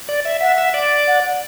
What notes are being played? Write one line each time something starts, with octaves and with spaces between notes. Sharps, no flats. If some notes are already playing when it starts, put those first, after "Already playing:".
D5
E5
E5 F#5
E5
D5
F#5